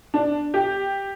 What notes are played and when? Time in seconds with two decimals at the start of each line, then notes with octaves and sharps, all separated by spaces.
0.14 D4
0.54 G4